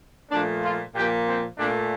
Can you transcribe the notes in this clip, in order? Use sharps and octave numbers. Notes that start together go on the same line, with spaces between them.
A#2 F3 A3 D4
F4
A#2 F3 A#3 G4
C4
A#2 A3 D4